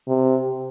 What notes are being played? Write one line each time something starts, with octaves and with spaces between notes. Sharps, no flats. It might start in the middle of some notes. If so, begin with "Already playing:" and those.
C3